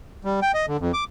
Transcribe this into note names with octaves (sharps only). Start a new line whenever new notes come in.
G3
G5
D#5
D3
F2
D6